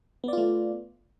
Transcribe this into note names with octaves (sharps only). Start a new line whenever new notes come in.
A3 B3 F4 D5